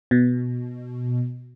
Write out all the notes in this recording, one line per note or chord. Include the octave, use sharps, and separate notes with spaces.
B2